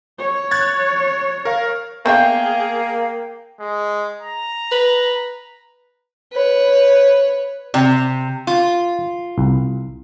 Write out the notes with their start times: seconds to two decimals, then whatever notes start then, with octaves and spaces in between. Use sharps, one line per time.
0.19 C#5
0.51 F#6 G#6 A6
1.45 A#4 F5
2.06 A#3 B3 D4 G#4 E5 F5 G5
3.59 G#3
4.21 A#5
4.72 B4
6.33 B4 C#5
7.74 C3 G4 D5
8.47 F4
9.38 C2